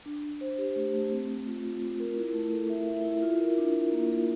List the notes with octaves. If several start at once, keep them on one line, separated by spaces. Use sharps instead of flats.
D4
D4
C5
G4
A3
A3
C4
C4
F4
F4
F4
A#4
E4
A3
A4
E5
E5
E4
F4
A#4
D4
F4
A#3
F4